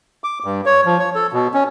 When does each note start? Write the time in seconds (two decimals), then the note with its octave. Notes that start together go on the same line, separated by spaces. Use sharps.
0.24 D6
0.44 G2
0.66 C#5
0.85 F3
0.99 C#5
1.15 A4
1.32 B2
1.54 C#4